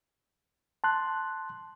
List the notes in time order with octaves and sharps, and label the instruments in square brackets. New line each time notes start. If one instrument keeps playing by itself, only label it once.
[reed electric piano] A5 C6 F#6